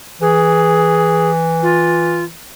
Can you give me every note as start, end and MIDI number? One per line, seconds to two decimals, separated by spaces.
0.21 2.33 52
0.21 1.31 68
1.63 2.24 65